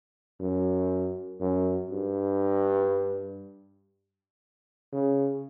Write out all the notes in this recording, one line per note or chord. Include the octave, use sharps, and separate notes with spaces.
F#2
F#2
G2
C#3